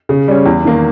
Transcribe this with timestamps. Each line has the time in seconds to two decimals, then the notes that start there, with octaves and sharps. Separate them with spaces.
0.09 C#3
0.28 G3 C#4
0.46 E2
0.65 D#3 A#3